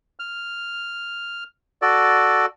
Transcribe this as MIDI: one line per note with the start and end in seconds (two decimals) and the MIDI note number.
0.20 1.44 89
1.82 2.46 66
1.82 2.46 69
1.82 2.46 74